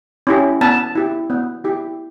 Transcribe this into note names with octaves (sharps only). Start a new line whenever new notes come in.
C#4 E4 G4
B3 A5
E4 G4
B3
E4 G4